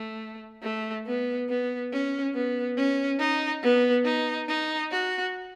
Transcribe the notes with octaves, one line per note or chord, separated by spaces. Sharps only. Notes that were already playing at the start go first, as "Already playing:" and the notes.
Already playing: A3
A3
B3
B3
C#4
B3
C#4
D#4
B3
D#4
D#4
F#4